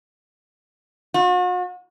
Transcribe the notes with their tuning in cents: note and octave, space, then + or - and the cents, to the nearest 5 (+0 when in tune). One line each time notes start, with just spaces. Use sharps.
F#4 -45